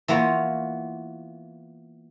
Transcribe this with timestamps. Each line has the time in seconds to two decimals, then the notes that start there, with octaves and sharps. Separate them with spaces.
0.08 E3 A#3 B3 F4 C#5